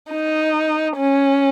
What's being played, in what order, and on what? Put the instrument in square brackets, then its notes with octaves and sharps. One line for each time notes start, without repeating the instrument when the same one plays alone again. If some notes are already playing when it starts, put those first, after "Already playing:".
[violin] D#4
C#4